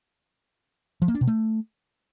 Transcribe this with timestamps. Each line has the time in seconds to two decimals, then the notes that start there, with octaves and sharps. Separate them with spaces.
1.02 F3
1.08 A#3
1.15 D4
1.21 B2
1.27 A3